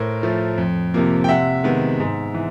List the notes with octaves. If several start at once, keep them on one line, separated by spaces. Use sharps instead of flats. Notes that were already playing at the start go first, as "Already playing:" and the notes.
Already playing: A2 A#4 C5
F3 A3
F2
C3 F3 A#3
G5
C3 E5 F#5
D#3 G#3 B3
G#2
E3